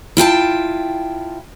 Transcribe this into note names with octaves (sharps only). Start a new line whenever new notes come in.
E4 F4 G5 A5